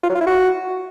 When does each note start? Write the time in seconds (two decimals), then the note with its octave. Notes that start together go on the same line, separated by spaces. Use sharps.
0.03 F4
0.09 F#3
0.15 F4
0.21 E4
0.26 F#4